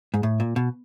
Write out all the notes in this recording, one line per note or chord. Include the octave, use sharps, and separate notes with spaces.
G#2
A2
A#2
B2